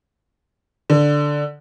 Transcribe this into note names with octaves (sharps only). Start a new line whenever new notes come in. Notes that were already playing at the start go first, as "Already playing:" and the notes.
D3